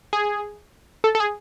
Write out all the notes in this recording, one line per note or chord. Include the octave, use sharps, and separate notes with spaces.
G#4
A4
A4
G#4